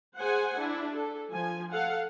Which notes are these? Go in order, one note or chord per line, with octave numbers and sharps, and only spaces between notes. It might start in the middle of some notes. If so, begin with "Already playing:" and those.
G#4 C5 F#5 G#5
D4 E4
A4
F3 G#5
A4 F5 F#5